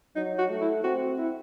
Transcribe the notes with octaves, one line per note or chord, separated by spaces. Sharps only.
F#3 D#4
F#4
A3
E4
C4 F#4
E4